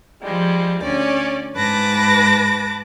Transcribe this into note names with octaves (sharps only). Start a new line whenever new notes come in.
F3 G3 G#3
D2 C#4 D5
G#2 B4 A5 D6 A#6